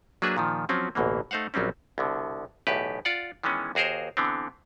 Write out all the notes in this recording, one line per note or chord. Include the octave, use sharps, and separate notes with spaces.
F#3 A#3 D4 G#4 B4 E5
A#2 D#3 F3
F3 F#3 C4 C#4
A1 D2 B2 E3 A#3
A3 D#4 C5 F5 F#5
A#1 F#3 G3 C4 C#4
C2 B2 D3
B1 E2 A2 G4 B4
F4 D5 F#5
D#3 E3 G#3 B3 C#4
D#2 F#4 G#4 A#4 C5
D3 E3 B3 C4